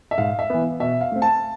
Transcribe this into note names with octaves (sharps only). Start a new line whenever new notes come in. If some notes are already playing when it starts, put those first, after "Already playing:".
E5
G#2 F5
E5
E3 B3
B2 E5
F5
A3 C4
A5